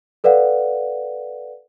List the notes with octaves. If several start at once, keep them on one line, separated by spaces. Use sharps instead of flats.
A4 B4 D5 F5 F#5